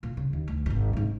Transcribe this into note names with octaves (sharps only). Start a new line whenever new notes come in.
A#2
C#3
D#2
D2
D#1 G#1
G#2 C#4